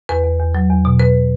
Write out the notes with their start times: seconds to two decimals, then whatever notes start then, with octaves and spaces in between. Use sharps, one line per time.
0.09 E2 B4
0.24 E2
0.39 E2
0.55 F#3
0.70 E2
0.85 B2
1.00 B2 B4